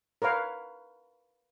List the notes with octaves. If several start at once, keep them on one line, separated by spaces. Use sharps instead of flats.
A#4 B4 C#5 F5